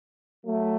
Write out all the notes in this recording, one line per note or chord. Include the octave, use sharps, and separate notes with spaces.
F#3 A3